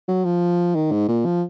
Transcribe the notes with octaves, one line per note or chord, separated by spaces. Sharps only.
F#3
F3
D#3
G#2
A#2
F3